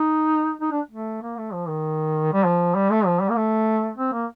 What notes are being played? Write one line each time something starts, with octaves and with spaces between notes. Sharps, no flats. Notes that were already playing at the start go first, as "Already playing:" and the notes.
Already playing: D#4
D#4
D4
A3
A#3
A3
F3
D#3
G3
F3
G3
A3
F3
G3
A#3
A3
C4
A#3